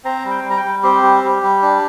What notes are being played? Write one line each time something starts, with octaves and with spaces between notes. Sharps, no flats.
C4 A#5
G3
G5
G3
A#5
G5
G3
C4 G4
G3
G3
G3
D4